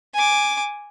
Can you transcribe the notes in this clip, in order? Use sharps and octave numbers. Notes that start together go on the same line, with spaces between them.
G#5 D6